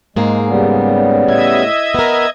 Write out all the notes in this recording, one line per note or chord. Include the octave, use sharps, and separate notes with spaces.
G#2 G#3 A#3 G#4
C#3 G3 B3
A2 D#5 E5 G#6
B3 A#4